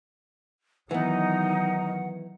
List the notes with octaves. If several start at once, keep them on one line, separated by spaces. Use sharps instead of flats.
D#3 E3 F#3 B3 D#4 F#5